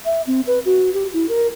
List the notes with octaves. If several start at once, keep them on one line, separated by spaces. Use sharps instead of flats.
E5
C4
B4
F#4
G4
E4
A#4